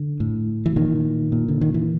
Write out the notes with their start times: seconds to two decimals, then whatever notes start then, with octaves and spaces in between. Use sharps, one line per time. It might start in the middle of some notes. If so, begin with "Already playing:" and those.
Already playing: D3
0.20 A2
0.66 E3
0.76 A#2 D#3
1.32 A#2
1.48 D3
1.61 D#3
1.74 E3